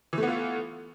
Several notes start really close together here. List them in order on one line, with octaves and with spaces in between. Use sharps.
E3 A3 B3 F4